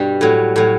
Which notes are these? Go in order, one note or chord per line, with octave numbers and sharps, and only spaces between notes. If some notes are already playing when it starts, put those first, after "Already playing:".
Already playing: G2 B2 G3
A2 F#3
A2 F#3